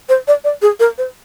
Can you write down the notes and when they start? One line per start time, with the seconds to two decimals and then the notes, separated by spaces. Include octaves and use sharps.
0.09 C5
0.28 D5
0.44 D5
0.62 G#4
0.80 A#4
0.98 C5